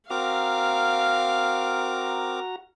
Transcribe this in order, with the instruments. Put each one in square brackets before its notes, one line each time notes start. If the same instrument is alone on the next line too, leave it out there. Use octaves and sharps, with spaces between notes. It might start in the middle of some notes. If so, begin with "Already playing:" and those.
[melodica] C4 A#4 D6 [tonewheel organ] F#4 A#5 [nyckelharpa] F5